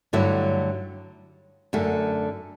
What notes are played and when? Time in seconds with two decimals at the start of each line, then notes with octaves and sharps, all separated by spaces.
0.13 G2 D3 F#3 A3 E4
1.73 F#2 D3 A3